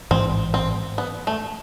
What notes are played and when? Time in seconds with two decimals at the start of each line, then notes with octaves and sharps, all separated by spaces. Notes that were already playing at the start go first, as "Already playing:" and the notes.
0.11 A1 G#2 E3 G#3 C4
0.54 C4
0.98 B3
1.27 A3